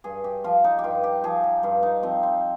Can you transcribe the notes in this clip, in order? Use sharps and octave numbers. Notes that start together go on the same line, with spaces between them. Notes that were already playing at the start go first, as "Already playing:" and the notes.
G2 G#4
G4
F3 F4
D#4
G4
G2 F4
G4
F3 G#4
G4
G2 F4
D#4
F3 C4
C4